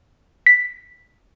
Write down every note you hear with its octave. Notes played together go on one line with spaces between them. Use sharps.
B6